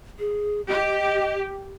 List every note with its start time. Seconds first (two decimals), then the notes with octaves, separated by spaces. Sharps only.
0.19 G#4
0.69 G4 D#5